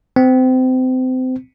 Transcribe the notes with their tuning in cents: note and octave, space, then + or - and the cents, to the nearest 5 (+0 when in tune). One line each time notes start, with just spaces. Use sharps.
C4 -30